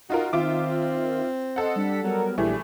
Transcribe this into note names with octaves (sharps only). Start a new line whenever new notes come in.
D#4 F4 F#4 A#4
D#3 C4 F4 E5 D6
A4 D#5 F#5 C6
G3 D4 B6
F#3 G3 B3 A#4
A#1 E3 G3 A3 G#4